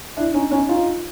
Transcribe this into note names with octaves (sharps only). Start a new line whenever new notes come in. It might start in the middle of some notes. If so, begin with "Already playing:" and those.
D4 E4
C#4 D#4
C#4 D#4
D#4 F4